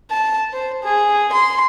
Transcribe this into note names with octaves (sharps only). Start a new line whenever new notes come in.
A5
C5
G#4
C6